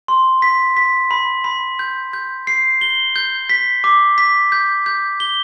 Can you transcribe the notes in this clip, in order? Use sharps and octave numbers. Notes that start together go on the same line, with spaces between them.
C6
B6
B6
B5
B5
G6
G6
C7
G7
G6
B6
D6
B6
G6
G6
G7